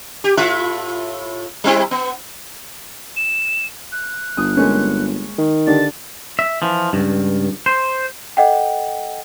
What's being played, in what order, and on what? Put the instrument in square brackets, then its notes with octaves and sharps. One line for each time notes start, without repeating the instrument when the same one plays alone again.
[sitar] G4
A2 F4 E5
G3 C4 E4
B3
[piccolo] E7
F#6
[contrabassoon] G1 [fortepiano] D#6
[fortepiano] G#3 A#3 C#4
[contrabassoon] D#3
[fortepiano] D3 D4 G4 [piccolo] A6
[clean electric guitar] E5
E3 F3
C#2 G2
C5
[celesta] A4 D#5 F#5 G5